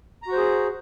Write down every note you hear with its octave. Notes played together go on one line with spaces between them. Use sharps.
F#4 G#4 C5 A#5